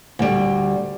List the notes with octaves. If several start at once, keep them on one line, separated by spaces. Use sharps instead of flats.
D2 G3